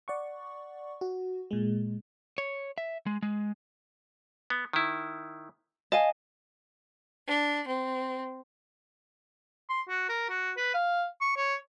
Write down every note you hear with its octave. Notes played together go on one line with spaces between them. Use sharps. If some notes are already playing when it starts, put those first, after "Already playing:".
D5 F#5 C#6
F#4
A#2 G#3
C#5
E5
G#3
G#3
B3
D#3 E4
D#5 F5 G#5 A5
D4
C4
C6
F#4
A#4
F#4
B4
F5
C#6
C#5